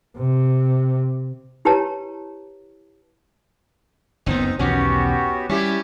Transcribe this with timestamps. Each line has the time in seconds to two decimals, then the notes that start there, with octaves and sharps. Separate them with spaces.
0.18 C3
1.65 E4 G4 B4 C#5 A5 A#5
4.26 F#1 D2 B3 C4 D#4
4.59 B1 E2 D#3 B3 C#4 F#4 G4
5.49 G3 C#4 E4 G4